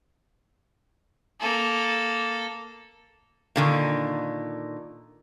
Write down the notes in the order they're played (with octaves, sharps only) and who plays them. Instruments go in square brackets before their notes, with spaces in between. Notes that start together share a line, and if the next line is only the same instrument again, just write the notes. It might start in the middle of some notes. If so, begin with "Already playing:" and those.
[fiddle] A#3 A4
[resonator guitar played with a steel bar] A#2 D3 D#3